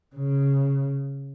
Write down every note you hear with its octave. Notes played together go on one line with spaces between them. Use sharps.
C#3